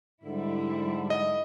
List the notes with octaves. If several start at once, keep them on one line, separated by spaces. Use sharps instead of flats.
G#2 D3 G3 E4
D#5